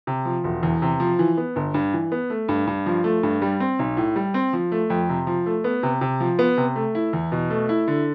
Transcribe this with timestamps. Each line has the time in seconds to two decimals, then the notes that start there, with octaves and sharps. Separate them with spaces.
0.07 C3
0.25 F3
0.44 E1
0.63 E2
0.82 C3
1.00 F3
1.19 E3
1.37 B3
1.56 G1
1.74 G2
1.93 E3
2.12 B3
2.30 A3
2.48 G2
2.67 G2
2.86 F3
3.04 A3
3.23 G2
3.42 G3
3.60 C4
3.79 B1
3.97 A2
4.16 G3
4.34 C4
4.53 F3
4.72 A3
4.90 F2
5.09 C3
5.27 F3
5.46 A3
5.64 B3
5.83 C3
6.01 C3
6.20 F3
6.39 B3
6.57 C3
6.76 A3
6.95 E4
7.13 E2
7.32 B2
7.50 A3
7.69 E4
7.88 D3